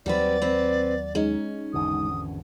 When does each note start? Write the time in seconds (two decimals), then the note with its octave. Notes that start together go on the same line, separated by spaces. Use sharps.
0.06 D#2 F#3 G3 C4 B4 D5
0.42 C4 B4
1.15 G#3 C#4 D#4
1.74 G#1 E2 D3 D#6